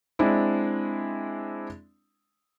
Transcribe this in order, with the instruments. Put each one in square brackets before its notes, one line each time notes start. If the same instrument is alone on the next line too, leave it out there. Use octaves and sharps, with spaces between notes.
[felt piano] G#3 C4 D4 E4